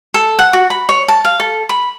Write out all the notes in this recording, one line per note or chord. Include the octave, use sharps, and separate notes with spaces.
A4
F#5
F#4
B5
C#5
A5
F5
A4
B5